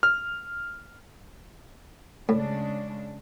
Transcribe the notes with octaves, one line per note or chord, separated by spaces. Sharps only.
F6
A2 C#3 G#3 D4